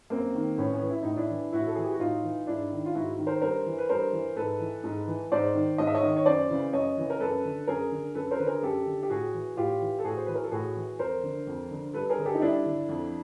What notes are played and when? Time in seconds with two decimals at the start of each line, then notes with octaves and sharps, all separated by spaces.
0.10 F#2 A#3 C4
0.35 D#3
0.58 A2 B3 C#4
0.74 B3 C#4
0.82 E3
0.90 E4
1.03 A2 D#4
1.17 D4 E4
1.30 E3
1.53 A2 E4 F#4
1.67 A4
1.75 E3 G#4
1.84 G4
1.92 F#4
2.00 A2 D#4 F4
2.24 E3
2.47 G#2 D4 E4
2.72 D#3
2.86 F4
2.95 G#2 E4 F#4
3.18 D#3
3.27 A#4 C5
3.42 G2 A#4 C5
3.66 E3
3.78 B4
3.89 G2 A#4 C5
4.13 E3
4.36 G#2 A4 B4
4.60 E3
4.84 G#2
5.07 E3
5.32 G#2 C5 D5
5.55 D#3
5.78 G#2 D#5
5.87 E5
5.95 C#5 D#5
6.03 D#3
6.16 C#5
6.26 F#2 C5 D5
6.50 C#3 E3
6.73 F#2 C#5 D#5
6.97 C#3 E3
7.10 A#4
7.20 F#2 A4 B4
7.45 D3
7.67 F#2 G#4 A#4
7.92 D3
8.15 F#2 A4 B4
8.31 A#4 C5
8.39 D3 B4
8.47 G#4 A#4
8.63 F#2 G4 A4
8.86 D3
9.03 G4
9.10 A2 F#4 G#4
9.34 E3
9.57 A2 F4 G4
9.81 E3
9.99 A4
10.04 A2 F#4 G#4
10.17 C5
10.26 E3 B4
10.35 A#4
10.43 A4
10.51 A2 F#4 G#4
10.76 E3
10.99 F2 A#4 C5
11.23 D3
11.47 F2
11.71 D3
11.94 G2 A4 B4
12.09 G#4 A#4
12.18 D3
12.25 G4 A4
12.35 D#4
12.42 G2 D4 E4
12.66 D3
12.89 F2